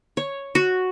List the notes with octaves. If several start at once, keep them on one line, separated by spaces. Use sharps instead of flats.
C#5
F#4